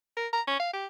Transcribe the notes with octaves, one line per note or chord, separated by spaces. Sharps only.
A#4
A#5
C#4
F5
G4